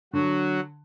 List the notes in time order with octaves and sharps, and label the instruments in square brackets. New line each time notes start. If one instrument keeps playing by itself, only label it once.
[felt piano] D3 [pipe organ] F#3 F#4